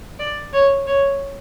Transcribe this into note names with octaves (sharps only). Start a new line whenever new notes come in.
D5
C#5
C#5